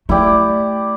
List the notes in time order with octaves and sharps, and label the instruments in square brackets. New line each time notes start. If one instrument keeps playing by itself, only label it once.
[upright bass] A3 [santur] E4 G4 D5